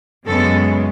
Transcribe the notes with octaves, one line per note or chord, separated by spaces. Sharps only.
F#2 C#3 G#3 B3 A4